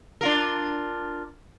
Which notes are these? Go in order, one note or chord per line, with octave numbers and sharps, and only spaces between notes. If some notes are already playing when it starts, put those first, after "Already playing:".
D4 F4 A#4